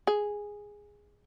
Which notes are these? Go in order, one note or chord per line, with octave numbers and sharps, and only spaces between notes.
G#4